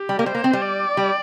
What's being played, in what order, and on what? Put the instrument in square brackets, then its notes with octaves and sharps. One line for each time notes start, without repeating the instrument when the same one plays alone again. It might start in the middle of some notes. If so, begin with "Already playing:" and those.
Already playing: [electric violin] G4
[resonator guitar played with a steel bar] G3
A#3
[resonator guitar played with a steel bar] G3 [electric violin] C5
[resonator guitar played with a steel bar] A#3
C4
G3
[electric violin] D5
[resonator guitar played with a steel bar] G3